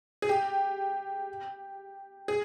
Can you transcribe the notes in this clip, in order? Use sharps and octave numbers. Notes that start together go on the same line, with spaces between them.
G#4
G4
G#4